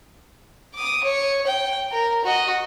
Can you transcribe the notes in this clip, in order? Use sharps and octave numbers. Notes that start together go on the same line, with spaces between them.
D6 D#6
C#5
G5
A#4
F#4 D#5